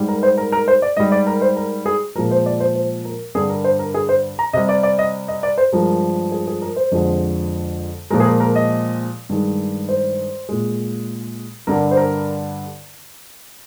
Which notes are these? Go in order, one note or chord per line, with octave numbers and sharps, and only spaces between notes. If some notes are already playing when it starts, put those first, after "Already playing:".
Already playing: G#2 G3
A#4
C5
A#4
A#4
C5
D5
G#2 G3 D#5
D5
A#4
C5
A#4
G#4
A#2 F3 G#3 A#4
C5
D5
C5
C5
A#4
G2 D3 G3 G#4
A#4
C5
A#4
G#4
C5
A#5
C3 G3 D#5
D5
D5
D#5
D#5
D5
C5
G2 F3 G#3 A#4
G#4
G#4
A#4
C5
F2 D3 F3 G#3
A#2 F3 G#3 A#4
G#4
A#4
A#4
D#5
G2 D#3 G#3
C5
A#2 G#3
G2 D3 G3 A#4
C5
A#4